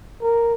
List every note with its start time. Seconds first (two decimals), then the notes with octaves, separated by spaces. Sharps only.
0.22 A#4